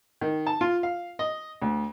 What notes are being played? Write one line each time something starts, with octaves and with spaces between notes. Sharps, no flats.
D#3
A5
F4
F5
D#5
D2